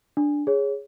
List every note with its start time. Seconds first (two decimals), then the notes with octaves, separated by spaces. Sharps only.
0.17 D4
0.47 G#4 C#5